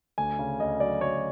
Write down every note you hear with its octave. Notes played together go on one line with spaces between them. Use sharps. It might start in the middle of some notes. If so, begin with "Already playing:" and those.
D2 G#5
C#3
D2 D#5
F#3 D5
D2 C#5